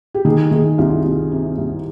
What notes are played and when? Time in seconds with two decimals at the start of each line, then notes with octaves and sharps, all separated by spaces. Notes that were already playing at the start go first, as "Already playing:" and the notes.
0.14 G4
0.25 D#3 G#4
0.51 D#3 G#4
0.78 C2 F4
1.05 C2
1.32 C3
1.58 C2